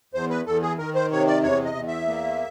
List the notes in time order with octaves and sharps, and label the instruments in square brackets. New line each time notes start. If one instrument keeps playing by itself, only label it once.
[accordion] E2 C5
B4
E2 A4
G#4
D#3 A#4
C5
C3 C#5
D5
E2 C#5
D#5
E2
E5
A#3